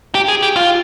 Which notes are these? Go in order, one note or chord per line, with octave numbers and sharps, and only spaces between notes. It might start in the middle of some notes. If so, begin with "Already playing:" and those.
G4
G#4
G4
F4